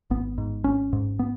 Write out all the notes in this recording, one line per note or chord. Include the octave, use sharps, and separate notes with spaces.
G#1 B3
G#2
G#1 C#4
G#2
B3